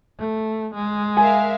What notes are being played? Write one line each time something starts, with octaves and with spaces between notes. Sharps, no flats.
A3
G#3
A#4 E5 F5 G#5